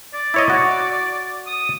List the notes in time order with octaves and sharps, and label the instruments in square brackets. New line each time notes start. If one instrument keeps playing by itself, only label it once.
[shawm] D5
[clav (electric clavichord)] E4 C#5 D#5
F#4
[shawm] D#6